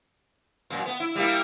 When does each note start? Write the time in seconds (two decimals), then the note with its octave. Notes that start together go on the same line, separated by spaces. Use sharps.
0.70 F#2 A#2
0.85 B3
1.00 E4
1.15 G3 A#3 E4